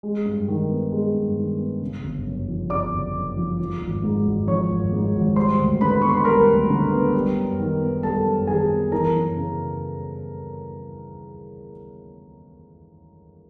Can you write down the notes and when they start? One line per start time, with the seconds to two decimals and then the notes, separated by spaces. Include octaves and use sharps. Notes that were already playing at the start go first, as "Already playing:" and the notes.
0.03 G#3
0.25 G2
0.48 D#3
0.70 B3
0.92 G#3
1.14 G2
1.37 D#3
1.59 B3
1.81 C#3
2.04 G1
2.26 F#2
2.48 F3
2.70 C#3 D5 D6
2.92 G1
3.15 F#2
3.37 F3
3.59 F3
3.81 G#1
4.03 G#2
4.26 G#1
4.47 F3 C#5 C#6
4.70 G#1
4.92 G#2
5.15 G#1
5.36 G3 C5 C6
5.59 D2
5.81 D3 B4 B5
6.02 B3 C#6
6.09 C6
6.17 B5
6.25 G3 A#4 A#5
6.48 D2
6.70 D3
6.92 B3
7.14 G3
7.37 F#2
7.59 D#3
7.81 B3
8.03 G3 A4 A5
8.25 F#2
8.47 D#3 G#4 G#5
8.70 B3
8.92 E3 A#4 A#5
9.15 F#2
9.37 C#3